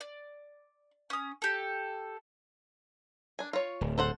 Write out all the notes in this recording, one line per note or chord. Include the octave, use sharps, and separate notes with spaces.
D5
C#4 D#6
G4 A4
D4 G#5
F4 C#5
D1
A4 C5 F#5